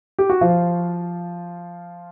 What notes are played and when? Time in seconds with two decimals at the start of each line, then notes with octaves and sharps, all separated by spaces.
0.19 G4
0.30 F#4
0.41 F3 F4